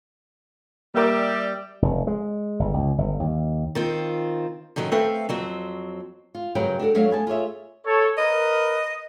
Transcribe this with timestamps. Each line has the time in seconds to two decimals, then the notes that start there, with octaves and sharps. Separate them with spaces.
0.95 G3 A#3 G4 A#4 D5 E5
1.82 F1
2.07 G#3
2.60 G1
2.74 C#2
2.98 G1
3.20 D#2
3.75 D#3 C4 F4
4.76 A2 D#3 F#3 C4 C#4
4.92 A3 C4 A4 B4 E5 F5
5.29 F2 F#3 C4
6.35 F4
6.55 G2 C#3 F#3 A#4 B4 G5
6.79 D4 F#4 A4 A#4
6.95 F#3 A3 D4 C#5 F5
7.11 B3 G#5 A5
7.27 F4 G#4 C#5 E5
7.85 A4 C#5
8.18 A#4 B4 D#5